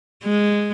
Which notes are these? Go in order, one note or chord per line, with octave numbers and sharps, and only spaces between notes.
G#3